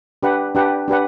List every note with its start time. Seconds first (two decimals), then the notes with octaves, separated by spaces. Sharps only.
0.23 D4 G4 B4 F#5
0.55 D4 G4 B4 F#5
0.88 D4 G4 B4 F#5